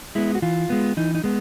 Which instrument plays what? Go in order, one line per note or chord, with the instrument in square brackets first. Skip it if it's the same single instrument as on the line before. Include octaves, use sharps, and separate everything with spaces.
[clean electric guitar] G#3 B3 E4
F#4
E3 F4
G#3 B3
E3 D#4
D#4
G#3 B3